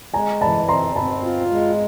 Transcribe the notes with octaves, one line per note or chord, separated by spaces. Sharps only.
G#3 G#5 A#5
E3 A5 B5
C4 A#5 C6
C4 A5 B5
F4
G#3